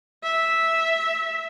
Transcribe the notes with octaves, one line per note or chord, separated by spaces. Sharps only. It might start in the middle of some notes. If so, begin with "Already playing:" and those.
E5